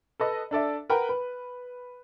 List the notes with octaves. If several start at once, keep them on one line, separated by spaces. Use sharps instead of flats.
A4 B4 D#5
D4 A4 D5 E5
A#4 B4 F#5 G5
B4